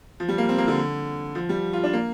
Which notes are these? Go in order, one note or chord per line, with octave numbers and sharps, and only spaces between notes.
F3
G3
A#3
C4
A#3
D3
F3
G3
F4
D4
A#3